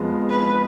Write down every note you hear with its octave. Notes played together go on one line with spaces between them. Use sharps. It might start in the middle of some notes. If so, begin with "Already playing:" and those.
Already playing: F2 F3 G#3 B3
B4